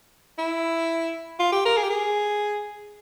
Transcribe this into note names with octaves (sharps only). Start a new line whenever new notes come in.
E4
F4
G4
A#4
G#4
G4
G#4